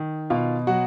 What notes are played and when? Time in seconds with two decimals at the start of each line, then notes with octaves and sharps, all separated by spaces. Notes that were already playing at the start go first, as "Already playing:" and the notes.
Already playing: D#3
0.30 B2 F4 F5
0.67 F#3 F#4 F#5